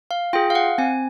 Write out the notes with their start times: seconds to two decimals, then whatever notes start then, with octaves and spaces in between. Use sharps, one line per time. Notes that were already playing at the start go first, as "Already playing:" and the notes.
0.11 F5
0.33 F4 G#4 G5
0.50 F5
0.55 F#5
0.78 C4 G#5